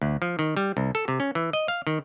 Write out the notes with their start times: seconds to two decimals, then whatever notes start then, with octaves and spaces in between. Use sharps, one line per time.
0.02 D2
0.22 F3
0.39 D#3
0.57 G3
0.77 C2
0.95 A4
1.08 C3
1.20 C#4
1.35 E3
1.53 D#5
1.68 F5
1.87 D#3